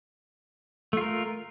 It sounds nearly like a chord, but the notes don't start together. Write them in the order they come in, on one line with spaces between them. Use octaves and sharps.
A3 F4 A#4